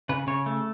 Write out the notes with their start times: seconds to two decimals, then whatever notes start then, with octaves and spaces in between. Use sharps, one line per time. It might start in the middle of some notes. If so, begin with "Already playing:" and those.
0.09 C#3 B4
0.27 C#3 C#5
0.46 A3